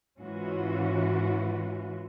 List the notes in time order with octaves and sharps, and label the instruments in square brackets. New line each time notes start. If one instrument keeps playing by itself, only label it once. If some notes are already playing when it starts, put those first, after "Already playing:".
[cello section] G#2 E3 C#4 F4 F#4